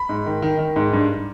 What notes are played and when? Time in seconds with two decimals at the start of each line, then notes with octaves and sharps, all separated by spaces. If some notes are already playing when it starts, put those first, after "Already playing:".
Already playing: B5
0.09 G#2
0.26 D#3
0.42 D#3
0.59 D#3
0.76 G#2
0.93 G2